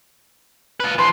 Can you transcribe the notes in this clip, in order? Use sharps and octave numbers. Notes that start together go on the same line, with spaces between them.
F4 B4
F3 B4 C6